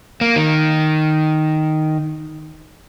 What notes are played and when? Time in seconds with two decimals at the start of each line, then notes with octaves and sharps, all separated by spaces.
0.21 A#3
0.36 D#3